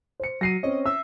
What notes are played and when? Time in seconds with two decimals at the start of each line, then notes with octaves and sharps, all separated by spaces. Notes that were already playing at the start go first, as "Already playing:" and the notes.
0.20 C5 C#7
0.41 F#3 A#6 C7 D#7
0.63 C4 C#4 D#5
0.86 E5 E6